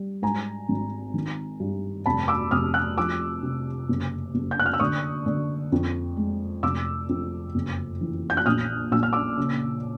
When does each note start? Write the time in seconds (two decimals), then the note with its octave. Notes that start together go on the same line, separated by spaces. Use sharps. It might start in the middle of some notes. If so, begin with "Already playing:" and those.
Already playing: G3
0.22 G#2 G#5 A#5
0.68 G#1
1.14 D#3
1.60 G2
2.06 F1 A5 B5
2.28 D6 E6
2.51 F1 D#6 F6
2.74 E6 F#6
2.98 F3 D6 E6
3.43 C3
3.89 F#1
4.34 F#1
4.51 G6
4.60 F#6
4.66 F6
4.74 E6
4.80 D3 C#6 D#6
5.26 D3
5.72 F2
6.17 G#3
6.63 F1 D6 E6
7.09 F2
7.55 F#1
8.01 E3
8.30 G6
8.37 F#6
8.46 A#1 D#6 F6
8.92 A#1 E6
9.03 F6
9.13 D6 E6
9.37 C#3